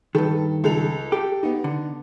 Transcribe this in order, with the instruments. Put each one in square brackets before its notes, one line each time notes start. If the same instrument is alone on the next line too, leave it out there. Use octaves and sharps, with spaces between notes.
[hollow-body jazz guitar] G2 D#3 [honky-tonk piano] A4 B4
[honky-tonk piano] C#2 A4 F7
[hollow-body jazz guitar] G4 [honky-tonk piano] A4
[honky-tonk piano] B3 D#4
[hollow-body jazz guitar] D3